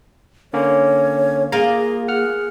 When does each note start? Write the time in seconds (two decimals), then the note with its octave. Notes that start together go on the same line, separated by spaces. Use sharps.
0.53 D3 A#3 C#4 C#5
1.52 A#3 F4 G#4 F5 A#5
2.08 G#4 F#5 F6